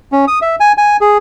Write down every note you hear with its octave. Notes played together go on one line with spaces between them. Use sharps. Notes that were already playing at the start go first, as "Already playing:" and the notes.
C#4
D#6
E5
G#5
G#5
G#4